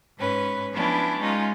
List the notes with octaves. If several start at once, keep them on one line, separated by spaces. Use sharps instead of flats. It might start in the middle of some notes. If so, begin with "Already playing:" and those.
G#2 C#4 B4
F3 B3 C#4 D4 E4
G#3 C#4 D#4 F4